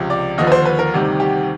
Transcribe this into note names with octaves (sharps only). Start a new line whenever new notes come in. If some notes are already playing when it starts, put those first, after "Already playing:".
Already playing: C#2 C3 F3
D5
D#2 D3 F3 D#5
B4
C5
B4
A#4
D2 C3 D#3 G3
G4